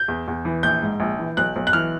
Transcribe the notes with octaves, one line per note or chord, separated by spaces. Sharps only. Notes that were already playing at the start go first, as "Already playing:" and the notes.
Already playing: G6
E2
E2
E3
A#1 G6
G#2
A#1
E3
B1 F#6
B1
F#6
E3 F6